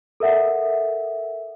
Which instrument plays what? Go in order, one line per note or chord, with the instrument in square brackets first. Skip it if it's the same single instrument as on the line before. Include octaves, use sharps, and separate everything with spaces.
[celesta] A4 A#4 E5 F#5